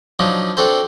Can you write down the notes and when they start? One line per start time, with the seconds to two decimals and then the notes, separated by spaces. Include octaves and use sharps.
0.19 F3 F#3 D4 D#4
0.57 C4 D4 F#4 A4 C5